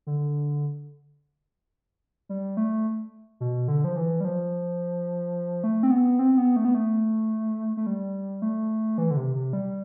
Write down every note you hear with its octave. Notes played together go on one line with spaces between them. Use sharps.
D3
G3
A3
B2
D3
F3
E3
G3
F3
A3
C4
B3
C4
B3
A3
B3
A3
A3
G3
A3
E3
D3
C3
C3
G3